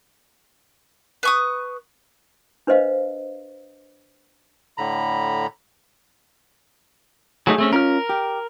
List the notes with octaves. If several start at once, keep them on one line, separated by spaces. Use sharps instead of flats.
B4 C#6 D#6
D4 B4 C5 D#5 F5
A2 D3 A#5 B5
F#3 A3 D#4 G#4
A3 C4 C#4
C#4 F4 A#4 F6
G4